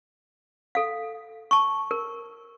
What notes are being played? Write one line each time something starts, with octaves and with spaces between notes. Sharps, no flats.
A4 F5
A5 C#6
A#4